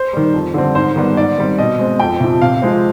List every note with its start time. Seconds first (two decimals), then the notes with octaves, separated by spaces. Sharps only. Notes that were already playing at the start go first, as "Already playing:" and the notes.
Already playing: C5
0.13 D#3 G3
0.34 F2
0.54 D3 G3 C4
0.75 G#2 C5
0.96 D#3 G3 B3
1.17 G#2 D5
1.38 D#3 G3 C4
1.59 B2 D#5
1.79 G#3 C4
2.00 F2 G5
2.20 C3 F3
2.42 C3 F5
2.62 F3 G#3 C4